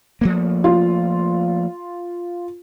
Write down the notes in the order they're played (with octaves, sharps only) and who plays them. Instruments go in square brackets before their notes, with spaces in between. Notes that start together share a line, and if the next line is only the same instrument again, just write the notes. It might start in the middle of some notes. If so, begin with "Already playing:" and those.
[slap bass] F3 A3 A#3
[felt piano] F4